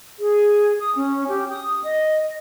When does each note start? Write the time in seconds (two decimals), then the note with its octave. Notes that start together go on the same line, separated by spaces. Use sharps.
0.20 G#4
0.79 D#6
0.95 C#4
1.27 G4
1.49 D#6
1.83 D#5